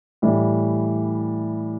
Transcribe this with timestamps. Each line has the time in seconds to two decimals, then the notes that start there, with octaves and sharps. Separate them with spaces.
0.22 A2 E3 G3